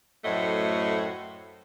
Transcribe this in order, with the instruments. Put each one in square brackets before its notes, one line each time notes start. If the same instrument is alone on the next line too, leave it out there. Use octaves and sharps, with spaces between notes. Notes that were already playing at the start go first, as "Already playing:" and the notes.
[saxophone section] F#2 A2 A3 F#4 C5 D#5